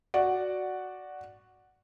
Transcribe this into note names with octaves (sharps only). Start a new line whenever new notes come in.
F#4 D5 F#5